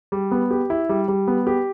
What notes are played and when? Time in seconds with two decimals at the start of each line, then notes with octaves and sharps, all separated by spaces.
0.12 G3
0.31 B3
0.51 G4
0.70 E4
0.89 G3
1.08 G3
1.28 B3
1.47 G4